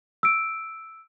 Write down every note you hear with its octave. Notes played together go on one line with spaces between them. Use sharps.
E6 D7